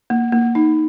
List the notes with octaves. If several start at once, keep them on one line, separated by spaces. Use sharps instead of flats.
A#3
A#3
D#4